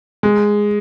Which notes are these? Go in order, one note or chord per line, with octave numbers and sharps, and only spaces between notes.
G#3